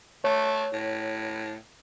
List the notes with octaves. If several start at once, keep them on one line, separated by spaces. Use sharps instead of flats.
A3 C#5
A2